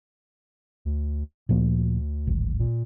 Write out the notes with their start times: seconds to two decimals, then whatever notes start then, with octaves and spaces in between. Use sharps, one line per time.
0.85 D2
1.49 D2 A#2 F3 A#3
2.27 D1 G#1
2.59 A#2